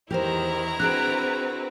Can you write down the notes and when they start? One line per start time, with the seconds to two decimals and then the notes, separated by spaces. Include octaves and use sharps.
0.11 E2 D#3 E4 G4 A#4 C5 A#5
0.80 C4 D4 F#4 G#4 A#4 B4 F#6 D7